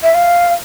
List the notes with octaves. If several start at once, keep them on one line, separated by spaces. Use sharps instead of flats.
E5
F5